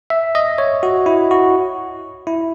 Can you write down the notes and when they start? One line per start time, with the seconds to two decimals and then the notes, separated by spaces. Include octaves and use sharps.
0.10 E5
0.35 D#5
0.58 C#5
0.83 F#4
1.06 E4
1.31 F#4
2.27 E4